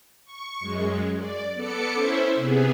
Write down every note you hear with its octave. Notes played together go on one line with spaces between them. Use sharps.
C#6
F#2 G#3
D5
B3 A4 D6 C#7
C#4 E4 C5 E5
C3 B3 G#4